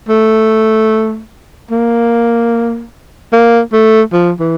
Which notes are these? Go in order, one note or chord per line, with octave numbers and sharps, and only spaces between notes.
A3
A#3
A#3
A3
F3
E3